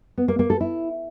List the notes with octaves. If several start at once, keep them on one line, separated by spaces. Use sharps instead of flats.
B3
A#3
A#3
A4
E4